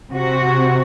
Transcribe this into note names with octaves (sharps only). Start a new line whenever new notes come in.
C3 F#4